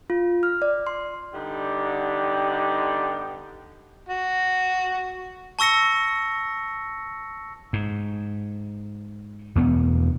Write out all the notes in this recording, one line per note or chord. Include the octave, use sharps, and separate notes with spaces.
F4
F6
D5
C6
D3 G3 B3 D#4 G4
F#4
A5 C#6 E6 A#6 C#7
G#2
E2 B2 A3 B3